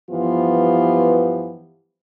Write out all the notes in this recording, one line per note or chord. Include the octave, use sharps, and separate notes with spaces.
G2 E3 F3 B3 F4 G4